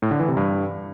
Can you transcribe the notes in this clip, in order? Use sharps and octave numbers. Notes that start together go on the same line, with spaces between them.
A2
D3
E3
C3
G2